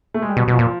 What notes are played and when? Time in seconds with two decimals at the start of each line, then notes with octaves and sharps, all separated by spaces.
0.14 A3
0.22 G#3
0.29 G3
0.36 B2 F#3
0.48 B2
0.53 F3
0.59 A#2